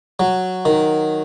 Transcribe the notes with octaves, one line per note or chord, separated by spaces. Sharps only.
F#3
D#3